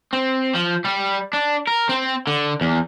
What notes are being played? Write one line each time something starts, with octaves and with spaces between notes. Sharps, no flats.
C4
F3
G3
D4
A#4
C4
D3
E2